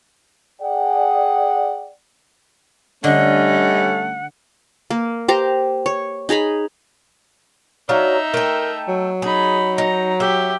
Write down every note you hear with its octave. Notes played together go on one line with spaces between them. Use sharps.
G#4 D5 F#5 G5
D3 G3 A3 C#4 D#5 F#5
A#3
G4 C5 A#5
C#5
D#4 G#4 A#5 B5
F#3 D4 D#4 E5 F5
A3 A#4 G5
F#3
D#4 G#4 B5
D#4 A#5
G4 E5